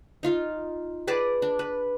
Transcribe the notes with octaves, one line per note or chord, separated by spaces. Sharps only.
D#4 F4 F5
G#4 B4 D5 A5
D4
B4